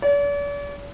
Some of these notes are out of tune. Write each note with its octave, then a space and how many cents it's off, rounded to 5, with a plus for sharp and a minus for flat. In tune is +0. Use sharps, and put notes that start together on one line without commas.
D5 -45